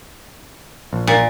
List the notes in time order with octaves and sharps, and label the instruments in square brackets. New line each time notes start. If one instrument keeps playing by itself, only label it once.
[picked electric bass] A#1
[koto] A#2